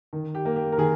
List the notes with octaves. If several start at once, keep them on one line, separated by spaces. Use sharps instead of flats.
D#3
G4
A#3
G4
A#4
D#3 G#4